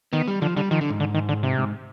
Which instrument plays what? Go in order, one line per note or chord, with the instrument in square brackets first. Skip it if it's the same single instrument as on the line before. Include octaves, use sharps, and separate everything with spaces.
[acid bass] D#3 [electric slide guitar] B3
[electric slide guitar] G3
[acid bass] D3 [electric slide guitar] F3
[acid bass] D3 [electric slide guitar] G3
[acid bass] D#3 [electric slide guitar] F3
[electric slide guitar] D3
G#2
[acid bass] D3
D#3
D3
C3
[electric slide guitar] G#2